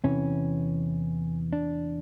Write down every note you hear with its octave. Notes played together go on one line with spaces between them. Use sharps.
E2 C3 E3 C#4
D4